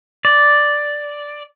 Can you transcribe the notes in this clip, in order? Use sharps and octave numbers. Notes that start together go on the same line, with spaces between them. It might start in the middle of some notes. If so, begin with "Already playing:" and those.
D5